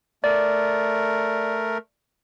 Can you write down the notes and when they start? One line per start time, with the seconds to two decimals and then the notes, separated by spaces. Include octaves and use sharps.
0.24 A3 A#4 D5